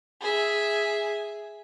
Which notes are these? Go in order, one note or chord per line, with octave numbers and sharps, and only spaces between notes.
G#4 E5